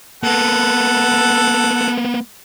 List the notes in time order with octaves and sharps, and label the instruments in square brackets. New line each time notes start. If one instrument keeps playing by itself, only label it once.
[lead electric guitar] A#3 B3 [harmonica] A4 F#5